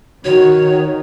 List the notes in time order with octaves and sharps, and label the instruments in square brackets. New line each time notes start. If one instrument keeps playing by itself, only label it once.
[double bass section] D#3 [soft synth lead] F#4 [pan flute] C#5